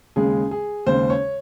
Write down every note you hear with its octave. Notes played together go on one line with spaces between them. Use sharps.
D#2 C#3 G#3 G#4
G#4
D#2 C#3 G#3 C5
C#5